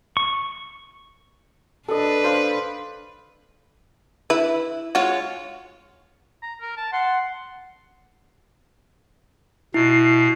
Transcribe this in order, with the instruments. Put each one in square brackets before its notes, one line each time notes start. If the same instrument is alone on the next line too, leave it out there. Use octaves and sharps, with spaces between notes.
[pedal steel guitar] C#6
[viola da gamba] D4 B4 [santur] A4 D#5
[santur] C5 F5
[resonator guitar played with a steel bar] E4 [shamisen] B4
[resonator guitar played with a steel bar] G#3 F4 C#5 [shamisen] F#4
[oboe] A#5
A#4
A5
[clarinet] F#5 [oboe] C6
[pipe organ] B2 [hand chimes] E4 [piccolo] C7